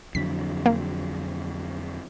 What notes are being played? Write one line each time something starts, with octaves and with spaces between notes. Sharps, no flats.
F2 D3 F#3 B6
A#3